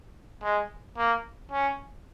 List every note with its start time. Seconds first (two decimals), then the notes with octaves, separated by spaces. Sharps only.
0.43 G#3
0.97 A#3
1.51 C#4